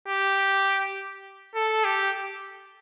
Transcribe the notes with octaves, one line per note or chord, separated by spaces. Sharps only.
G4
A4
G4